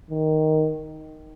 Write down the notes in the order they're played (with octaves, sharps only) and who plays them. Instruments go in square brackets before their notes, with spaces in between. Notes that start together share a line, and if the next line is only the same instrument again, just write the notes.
[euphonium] D#3